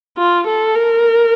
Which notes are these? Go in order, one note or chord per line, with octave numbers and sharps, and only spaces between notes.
F4
A4
A#4